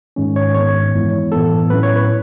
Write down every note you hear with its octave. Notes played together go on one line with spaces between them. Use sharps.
G#2 D#3 G#3 C#4
C#5
G#2 D#3 G#3 B3 C#5
F#2 E3 G#3 B3 E4
A2 E3 B3 E4 A4
A2 F#3 C#4 E4 B4
C#5
B4